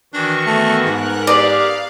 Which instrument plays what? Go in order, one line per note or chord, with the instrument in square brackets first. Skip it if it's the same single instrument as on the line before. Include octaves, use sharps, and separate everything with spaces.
[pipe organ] D#3 E3 F#4 [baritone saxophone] D4 [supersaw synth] C#6
[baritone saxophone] A3 [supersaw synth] B3
[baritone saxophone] G#2 [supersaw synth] A#4 F#6
[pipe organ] G4 G#4 [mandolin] D5 [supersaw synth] F5